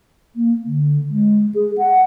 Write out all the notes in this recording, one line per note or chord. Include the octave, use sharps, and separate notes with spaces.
A#3
D3
G#3
G#4
F#5